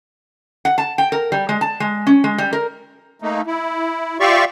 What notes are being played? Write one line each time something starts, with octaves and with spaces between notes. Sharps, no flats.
F#5
A5
G5
A#4
G3
G#3
A5
G#3
C#4
G#3
G3
A#4
A3 A#3 D#4
E4
F4 G4 D5 E5 F5 C#6